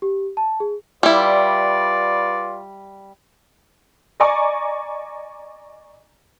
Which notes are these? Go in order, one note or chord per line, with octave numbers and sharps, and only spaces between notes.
G4
A5
G#4
G3 E4 F4 B4 D5
D5 D#5 G#5 A#5 C#6 D6